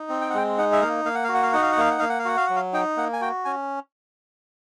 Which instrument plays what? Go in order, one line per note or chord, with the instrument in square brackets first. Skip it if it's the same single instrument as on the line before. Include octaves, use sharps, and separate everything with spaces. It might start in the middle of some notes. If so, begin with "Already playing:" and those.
Already playing: [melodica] D#4
C4
G5
F#5
G#3 G5
D#4 F#5
E5
A#3 F5
A#3 F5
F#5
F5
F#4
F#5
F5
D#4 F#5
F5
F#5
A#3 F5
F#5
A#3 F5
F#5
F5
F#4 F#5
F5
F#3 F#5
F5
D#4 G5
A#3 F#5
G#5
F#4 G5
C#4 G#5